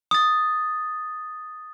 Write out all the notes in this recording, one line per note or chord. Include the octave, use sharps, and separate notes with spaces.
D#6 A6